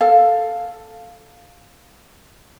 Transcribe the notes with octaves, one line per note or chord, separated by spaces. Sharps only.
A4 F5